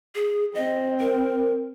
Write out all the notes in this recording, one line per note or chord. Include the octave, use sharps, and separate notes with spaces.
G#4
C4 D#5
A#4